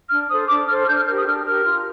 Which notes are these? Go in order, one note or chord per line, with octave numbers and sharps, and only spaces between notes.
D4 F6
A4 C5 D#6
D4 D6
A4 C5 F6
F6
D4 G6
F6
G4 A#4 F6
D#6
D4 F6
G4 A#4 F6
F4